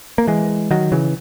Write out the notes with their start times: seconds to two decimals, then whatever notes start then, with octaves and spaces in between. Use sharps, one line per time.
0.18 A#3
0.27 E3 G#3
0.71 D#3 F#3
0.92 C#3 E3